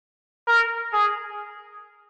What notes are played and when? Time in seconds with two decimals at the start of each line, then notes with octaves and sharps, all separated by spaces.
0.47 A#4
0.93 G#4